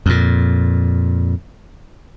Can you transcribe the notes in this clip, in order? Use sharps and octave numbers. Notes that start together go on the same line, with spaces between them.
F2 A#2